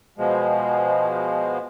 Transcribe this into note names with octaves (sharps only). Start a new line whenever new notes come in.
B2 F3 G#3